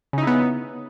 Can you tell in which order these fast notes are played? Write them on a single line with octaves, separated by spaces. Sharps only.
C#3 D#4 E4 B3